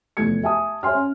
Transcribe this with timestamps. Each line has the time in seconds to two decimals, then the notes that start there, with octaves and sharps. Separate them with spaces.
0.17 F1 E2 A3 G#6 C#7
0.43 E5 G#5 A5 D#6
0.83 C#5 E5 G#5 C6 F6
0.95 C#4